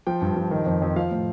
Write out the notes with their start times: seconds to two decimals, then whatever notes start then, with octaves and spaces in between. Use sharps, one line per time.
0.07 F3 G5
0.21 G2
0.37 F3
0.51 D#3
0.66 F2
0.82 F2
0.96 F3 F5
1.11 A2